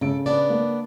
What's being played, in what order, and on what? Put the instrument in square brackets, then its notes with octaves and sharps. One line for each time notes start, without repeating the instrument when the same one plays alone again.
[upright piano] C#3 D7 [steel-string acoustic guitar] A4
[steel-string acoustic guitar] B3 D4 D5
[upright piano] A#3